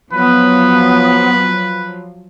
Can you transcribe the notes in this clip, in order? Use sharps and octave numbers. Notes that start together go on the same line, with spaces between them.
F3 F#3 B3 B4